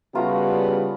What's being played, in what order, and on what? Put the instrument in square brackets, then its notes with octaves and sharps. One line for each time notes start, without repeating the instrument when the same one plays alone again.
[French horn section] C#3 G3 [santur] A3 F4 A#5 [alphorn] B3 [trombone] F#4